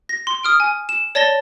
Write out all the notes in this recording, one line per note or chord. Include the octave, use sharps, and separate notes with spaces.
A#6
C6
D#6 F6 D7
G#5
E7
C#5 D5 A5 A6 A#6 G7